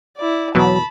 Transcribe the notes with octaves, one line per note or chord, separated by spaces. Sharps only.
E4 D5
E2 B2 E3 F#3 A5 B5